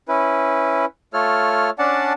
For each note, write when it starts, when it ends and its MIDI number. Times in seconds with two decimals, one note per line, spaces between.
0.08 0.85 61
0.08 0.85 64
0.08 0.85 71
1.14 1.70 57
1.14 1.70 65
1.14 1.70 69
1.14 1.70 73
1.14 1.70 89
1.79 2.13 61
1.79 2.13 62
1.79 2.13 74
1.79 2.13 78
1.79 2.13 81